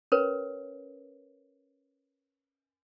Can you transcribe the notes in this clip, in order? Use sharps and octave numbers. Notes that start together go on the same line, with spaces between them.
C#4 A#4 B4 C#5